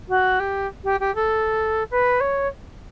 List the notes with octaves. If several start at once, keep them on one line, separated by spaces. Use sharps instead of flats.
F#4
G4
G4
G4
A4
B4
C#5